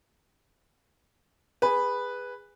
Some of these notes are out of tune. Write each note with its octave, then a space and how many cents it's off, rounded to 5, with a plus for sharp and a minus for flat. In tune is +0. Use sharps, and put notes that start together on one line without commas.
G#4 -20 B4 +0